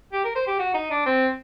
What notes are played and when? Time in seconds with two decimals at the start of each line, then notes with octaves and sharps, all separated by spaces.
0.13 G4
0.24 A#4
0.36 C5
0.47 G4
0.59 F#4
0.74 D#4
0.91 D4
1.06 C4